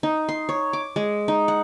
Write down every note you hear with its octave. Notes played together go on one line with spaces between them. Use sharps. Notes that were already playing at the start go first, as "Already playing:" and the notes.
D#4
C6
C#5
D6
G#3
D#4
F#5